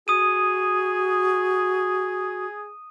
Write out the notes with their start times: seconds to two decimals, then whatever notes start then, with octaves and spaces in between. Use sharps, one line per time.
0.08 F#4 G#4 D#6 D#7